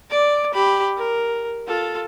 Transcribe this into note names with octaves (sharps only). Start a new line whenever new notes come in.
D5 D6
G4 B5
A#4
F4 A4